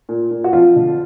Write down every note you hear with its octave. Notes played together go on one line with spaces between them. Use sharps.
A#2
A#2
F#4
F2 F3 F4
D3